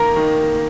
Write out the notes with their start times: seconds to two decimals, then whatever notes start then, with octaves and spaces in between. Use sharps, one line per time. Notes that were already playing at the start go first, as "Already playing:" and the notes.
Already playing: D#3 A#3 A#5
0.16 D#3